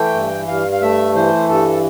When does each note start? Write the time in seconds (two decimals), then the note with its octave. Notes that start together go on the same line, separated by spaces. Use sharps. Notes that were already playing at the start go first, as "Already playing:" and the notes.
Already playing: E3 A3 G5
0.14 G2
0.48 G2 F5
0.72 F5
0.82 A3 E5
1.15 E3 C5
1.49 G2 A4